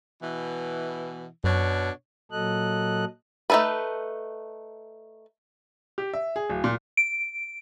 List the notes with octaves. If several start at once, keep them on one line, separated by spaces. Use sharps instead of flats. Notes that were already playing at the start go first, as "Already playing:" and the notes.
B2 E3
F#2 B2 D4 C#5
A#2 F#3 A4 D#5 F#6
A3 D#4 E4 A4 B4
G4
E5
G#4
D1
A#2
D7